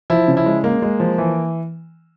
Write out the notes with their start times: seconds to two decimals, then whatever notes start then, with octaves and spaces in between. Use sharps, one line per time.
0.10 F3 E4
0.28 C#3
0.37 E4
0.46 G#3
0.64 G#3 A#3
0.82 G#3
1.00 F3
1.18 E3